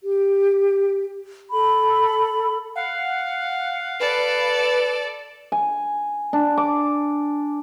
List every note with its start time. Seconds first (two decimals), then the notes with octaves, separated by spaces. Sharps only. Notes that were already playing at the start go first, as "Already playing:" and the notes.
0.02 G4
1.51 A4 B5
2.76 F5 F#5
4.00 A4 B4 D5
5.52 G#5
6.33 D4
6.57 D6